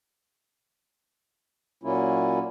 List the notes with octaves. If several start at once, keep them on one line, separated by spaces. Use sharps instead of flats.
A#2 F#3 A#3 C#4 E4 F4